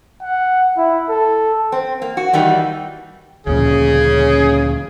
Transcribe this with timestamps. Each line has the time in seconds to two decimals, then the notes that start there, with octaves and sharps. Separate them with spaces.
0.22 F#5
0.77 E4
1.09 A4
1.72 C4
2.02 A#3
2.17 F#4
2.33 D#3 E3 G3 A#3
3.47 D2 A#2 C#3 F3 G#4